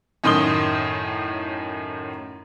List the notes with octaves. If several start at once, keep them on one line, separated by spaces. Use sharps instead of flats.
F#2 A2 D#3 C6 D#6 G7